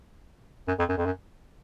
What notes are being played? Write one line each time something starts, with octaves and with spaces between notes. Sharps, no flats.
F#2
F2
F#2
F2
F#2